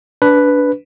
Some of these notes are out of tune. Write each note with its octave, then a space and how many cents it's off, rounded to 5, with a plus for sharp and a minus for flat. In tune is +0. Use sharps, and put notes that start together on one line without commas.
D4 -20 B4 +0